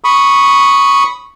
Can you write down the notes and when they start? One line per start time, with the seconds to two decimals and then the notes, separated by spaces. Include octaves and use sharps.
0.04 B5 C#6 D#6